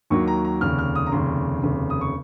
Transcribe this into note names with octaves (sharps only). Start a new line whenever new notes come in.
D#2 D#3 F#3 A#3 C#6
A#5
A#5
F1 D#2 C#3 F6
F6
D#6
A#5
F1 D#2 C#3 C6
F1 D#2 C#3
D#6
C#6